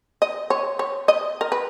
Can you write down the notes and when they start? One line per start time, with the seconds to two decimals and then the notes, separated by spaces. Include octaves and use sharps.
0.22 D#5
0.50 C#5
0.79 C#5
1.08 D#5
1.41 A#4
1.52 B4